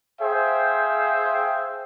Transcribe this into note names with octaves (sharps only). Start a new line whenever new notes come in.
G#4 C5 E5 F5 G5